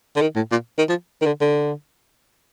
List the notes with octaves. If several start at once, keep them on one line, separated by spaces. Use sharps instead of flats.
D3
D#3
A2
A#2
D#3
F3
D#3
D3
D3